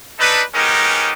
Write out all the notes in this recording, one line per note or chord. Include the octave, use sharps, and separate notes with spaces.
D4 D#4 A4 B4
G#3 B3 C#4 D#4 G4 A#4